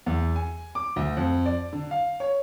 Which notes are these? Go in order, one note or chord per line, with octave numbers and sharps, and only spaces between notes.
E2
G#5
D6
D2
F2
D5
D3
F5
C#5